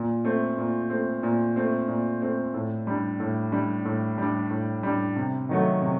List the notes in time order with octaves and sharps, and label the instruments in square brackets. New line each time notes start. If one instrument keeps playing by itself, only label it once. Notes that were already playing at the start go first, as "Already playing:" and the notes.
Already playing: [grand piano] A#2
A3 C4
A#2
A3 C4
A#2
A3 C4
A#2
A3 C4
A2
G3 D4
A2
G3 D4
A2
G3 D4
A2
G3 D4
C3
D#3 F#3 A3
C3